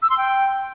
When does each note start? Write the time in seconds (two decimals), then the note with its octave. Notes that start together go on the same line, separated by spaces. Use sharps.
0.02 E6
0.10 C6
0.18 G5